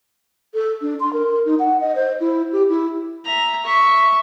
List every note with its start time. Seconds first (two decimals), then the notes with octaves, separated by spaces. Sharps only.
0.54 A4
0.82 D4
1.00 C6
1.13 A#4
1.46 D#4
1.59 F#5
1.81 D#5
1.96 C5
2.20 E4
2.52 G4
2.70 E4
3.24 E5 A#5
3.65 E5 C#6